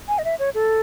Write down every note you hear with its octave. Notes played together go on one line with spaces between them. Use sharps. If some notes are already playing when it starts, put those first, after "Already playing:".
G#5
D#5
E5
C#5
A4